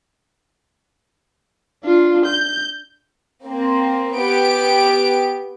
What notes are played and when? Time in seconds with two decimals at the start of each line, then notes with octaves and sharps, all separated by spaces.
1.83 D4 F4
2.26 G6
3.46 A#3 C4
4.16 B3 G4 D7